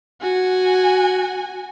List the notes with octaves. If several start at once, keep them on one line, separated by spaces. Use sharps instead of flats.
F#4 G#5